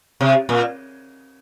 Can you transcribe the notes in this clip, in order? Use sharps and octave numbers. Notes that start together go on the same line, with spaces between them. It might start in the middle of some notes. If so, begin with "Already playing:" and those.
C3
A#2